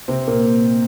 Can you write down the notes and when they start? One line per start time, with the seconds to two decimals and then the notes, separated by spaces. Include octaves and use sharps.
0.08 C3 C4
0.27 A#2 A#3